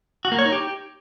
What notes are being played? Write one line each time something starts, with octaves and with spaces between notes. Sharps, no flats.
F#4
A#3
C#5
D#4
G4